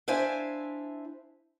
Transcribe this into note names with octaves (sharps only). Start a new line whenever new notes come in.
D4 E4 C5 E5 F5 G#5